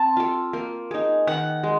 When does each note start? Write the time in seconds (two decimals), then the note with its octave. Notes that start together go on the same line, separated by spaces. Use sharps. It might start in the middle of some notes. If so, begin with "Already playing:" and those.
Already playing: C4 A5
0.17 F4 A4
0.53 A#3
0.91 D#4 G#4
1.27 D#3 F#5
1.63 G#3